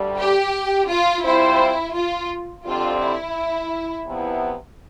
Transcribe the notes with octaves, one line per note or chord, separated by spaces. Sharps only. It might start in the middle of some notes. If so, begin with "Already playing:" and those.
Already playing: D2 D3 G3
G4
F4
G3 C4 E4 F4 C5
F4
F2 D3 G3 C4 F4 G4
E4
E2 C3 F3 B3 E4